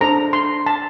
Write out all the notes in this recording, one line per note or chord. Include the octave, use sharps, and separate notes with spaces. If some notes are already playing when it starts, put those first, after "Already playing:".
D4 A4 C5 A#5
C6
A5